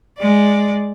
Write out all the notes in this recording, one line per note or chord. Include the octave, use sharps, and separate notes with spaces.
G#3 D5